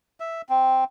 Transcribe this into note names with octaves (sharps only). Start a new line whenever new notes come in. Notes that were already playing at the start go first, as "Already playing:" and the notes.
E5
C4